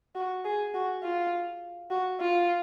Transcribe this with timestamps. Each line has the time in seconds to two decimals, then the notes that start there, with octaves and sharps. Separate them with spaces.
0.15 F#4
0.45 G#4
0.74 F#4
1.03 F4
1.90 F#4
2.20 F4